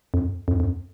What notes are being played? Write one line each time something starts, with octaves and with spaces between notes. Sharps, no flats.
F2
F2
F2